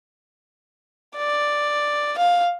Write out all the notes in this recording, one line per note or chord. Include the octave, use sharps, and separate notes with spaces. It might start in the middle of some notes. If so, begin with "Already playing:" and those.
D5
F5